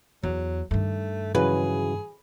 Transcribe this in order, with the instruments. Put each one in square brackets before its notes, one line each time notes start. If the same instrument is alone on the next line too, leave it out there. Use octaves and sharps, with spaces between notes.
[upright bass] E2 [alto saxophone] F#3
[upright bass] G2 D#3 [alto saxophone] A3
[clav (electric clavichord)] C#3 E3 F#3 [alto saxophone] G#4 [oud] B4